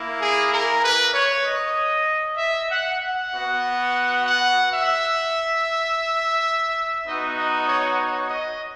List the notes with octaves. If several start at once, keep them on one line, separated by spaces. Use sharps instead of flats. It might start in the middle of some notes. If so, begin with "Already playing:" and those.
Already playing: A#3 E4
G#4
A#4
B4
C#5
D#5
E5
F#5
F#5
B3 F#4
F#5
E5
B3 D#4 F#4 D#5
D#5
C#5
C#5
D#5